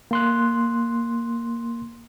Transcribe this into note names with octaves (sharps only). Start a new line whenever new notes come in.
A#3 C6 F#6